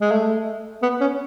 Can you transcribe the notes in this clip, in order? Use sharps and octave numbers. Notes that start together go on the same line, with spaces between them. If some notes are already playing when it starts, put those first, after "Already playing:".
G#3
A3
B3
C#4